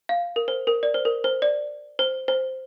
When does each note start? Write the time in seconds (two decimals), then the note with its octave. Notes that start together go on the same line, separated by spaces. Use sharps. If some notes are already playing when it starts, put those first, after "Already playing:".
0.09 F5
0.36 A#4
0.48 C5
0.67 A#4
0.83 D5
0.94 C5
1.05 A#4
1.24 C5
1.42 D5
1.99 C5
2.28 C5